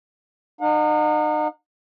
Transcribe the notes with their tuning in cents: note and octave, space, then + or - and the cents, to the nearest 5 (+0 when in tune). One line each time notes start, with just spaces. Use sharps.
D#4 -35 F#5 -45